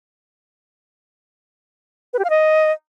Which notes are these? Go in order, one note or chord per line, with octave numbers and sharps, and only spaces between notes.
B4
G4
F5
D#5